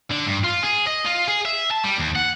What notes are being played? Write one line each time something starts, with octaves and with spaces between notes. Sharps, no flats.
D3
G2
F4
G#4
D#5
F4
G#4
E5
A5
G3
D#2
F#5